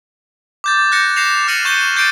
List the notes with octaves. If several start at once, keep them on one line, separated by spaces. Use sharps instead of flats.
D6 G6 A6
F#6 G6 A#6 C#7
G6 A#6 C7 E7 F7
D6 F6 A#6 C#7 D#7 F#7
C#6 G6 D#7 G7
D6 G6 A6 C7 D7 D#7